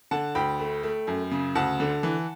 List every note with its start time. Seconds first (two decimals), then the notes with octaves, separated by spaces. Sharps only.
0.11 D3 F#5 A5
0.35 D2 G5 B5
0.60 A3
0.83 A3
1.07 F#2
1.31 C#3
1.55 D2 F#5 A5
1.80 D3
2.03 E3